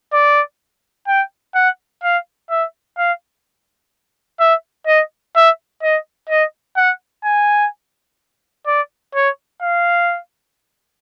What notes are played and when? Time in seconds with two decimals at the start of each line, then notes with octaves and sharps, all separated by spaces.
0.13 D5
1.08 G5
1.55 F#5
2.03 F5
2.50 E5
2.98 F5
4.40 E5
4.87 D#5
5.36 E5
5.83 D#5
6.30 D#5
6.77 F#5
7.25 G#5
8.67 D5
9.15 C#5
9.62 F5